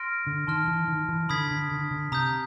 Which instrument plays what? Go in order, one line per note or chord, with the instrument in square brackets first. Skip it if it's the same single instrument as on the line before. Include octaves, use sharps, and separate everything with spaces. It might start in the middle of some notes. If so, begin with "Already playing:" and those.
Already playing: [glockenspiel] C6 F6 A#6 D7
[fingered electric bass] D3
[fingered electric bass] D#3 [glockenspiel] A5 C6 F6
[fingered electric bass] E3
D#3
E3
[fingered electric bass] D3 [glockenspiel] B5 D#6 G#6 B6
[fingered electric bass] D3
D3
D3
[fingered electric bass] C3 [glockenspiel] A#5 D#6 G6